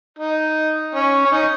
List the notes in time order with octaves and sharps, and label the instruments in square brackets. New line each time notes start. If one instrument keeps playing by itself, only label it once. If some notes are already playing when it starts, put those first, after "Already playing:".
[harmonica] D#4
C#4
C#4
D#4